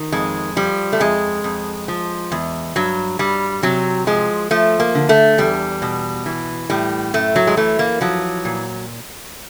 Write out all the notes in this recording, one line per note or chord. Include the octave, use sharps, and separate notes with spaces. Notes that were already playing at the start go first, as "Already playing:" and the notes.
Already playing: D#3
F2 G#3
F3 G3
A3
F2 G#3
F2
F3
E2
G2 F#3
G2 G3
C3 F#3
F3 G#3
F3 A3
A#3
D3
A3
E2 G3
B2
E3
A2 G3
F#2 A3
F#3
G#3
E3 A3
A#3
F3 F#3
A#2